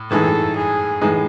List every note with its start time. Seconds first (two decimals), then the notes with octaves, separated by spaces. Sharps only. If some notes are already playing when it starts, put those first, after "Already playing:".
Already playing: A2
0.11 A2 E3 G#3 D#4 A4
0.56 G#4
1.01 A2 E3 G#3 D#4